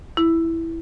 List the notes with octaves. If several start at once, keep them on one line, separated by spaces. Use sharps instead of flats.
E4